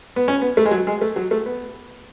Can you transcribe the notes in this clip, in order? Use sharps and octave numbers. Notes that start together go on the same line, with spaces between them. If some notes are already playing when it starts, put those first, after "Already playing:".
B3
C#4
B3
A3
G#3
F#3
G#3
A3
F#3
A3
B3